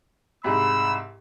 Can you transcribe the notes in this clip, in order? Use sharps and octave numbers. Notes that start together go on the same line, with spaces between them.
C2 G#2 B5 E6